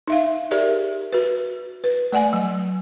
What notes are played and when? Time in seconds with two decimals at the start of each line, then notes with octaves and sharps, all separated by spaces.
0.08 D#4 E5 F5
0.51 G4 G#4 A#4 D5 E5
1.13 F#4 B4
1.84 B4
2.12 A3 D5 F#5 G#5
2.33 F#3